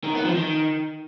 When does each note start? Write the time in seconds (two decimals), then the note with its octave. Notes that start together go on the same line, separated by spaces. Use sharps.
0.04 D#3
0.14 B3
0.24 F3
0.35 D#3